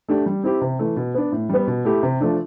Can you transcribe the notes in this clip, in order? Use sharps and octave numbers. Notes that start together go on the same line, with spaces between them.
A3 D4 G4
G3
C4 E4 G4
C3
E3 A3
B2
B3 D4
A2
G3 B3
B2
A3 E4 G4
C3
F3 A3 D4